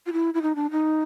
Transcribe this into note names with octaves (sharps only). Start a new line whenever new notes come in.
F4
E4
E4
D#4
D4
D#4